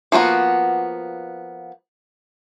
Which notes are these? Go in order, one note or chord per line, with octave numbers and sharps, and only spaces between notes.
F3 A#3 B3 F#4